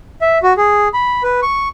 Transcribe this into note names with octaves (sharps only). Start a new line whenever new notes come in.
E5
F#4
G#4
B5
B4
C#6